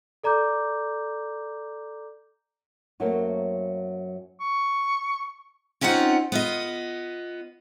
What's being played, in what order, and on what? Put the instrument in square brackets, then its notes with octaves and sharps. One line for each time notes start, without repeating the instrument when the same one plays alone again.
[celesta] A4 D5 A#5 D6 G6
[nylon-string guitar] F#2 F#3 A3 A#3 C4
[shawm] C#6
[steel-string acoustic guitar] C4 C#4 D#4 F4 F#5
B3 F4 D#5